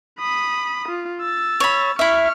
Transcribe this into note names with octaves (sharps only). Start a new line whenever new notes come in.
B5 D#6
F4
E6 A6
C#5 B5
E4 E5 C#6 F6